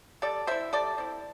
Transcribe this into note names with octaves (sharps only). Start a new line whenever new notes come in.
G3 A4 D5
C4 E4 C5 E5
G3 A4 D5
C4 E4